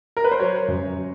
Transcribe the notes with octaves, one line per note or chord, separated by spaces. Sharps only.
A#4
B4
C5
F#3 C#5
F#2